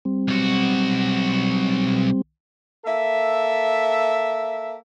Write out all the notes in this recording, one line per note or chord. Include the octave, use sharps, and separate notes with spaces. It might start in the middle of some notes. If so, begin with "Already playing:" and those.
G3 C4
B1 F#4
A#3 A4 E5